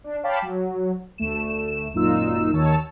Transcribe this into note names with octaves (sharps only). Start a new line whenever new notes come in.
D4
C#5 F5 G5 A5 B5 D6
F#3
D2 A3 E7
G#1 F#2 A#2 D#4 F4 E6
D#2 D#3 C#5 A5 E6